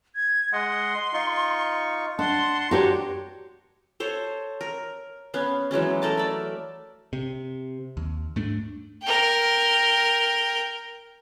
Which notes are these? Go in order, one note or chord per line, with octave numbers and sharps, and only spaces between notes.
G#6
G#3 D#5 F#5 C6
D#4 F4 C#6
D4 F#5 A5 C6
D4 F#4 G4 C#5 A#5
A4 C5 C#5
A#4
B3 C#4 F5
E3 F#3 G#3 C#4
A3 A#4 A5
D5 E5
C3
D#2
G#2 A3 D4
A#4 G5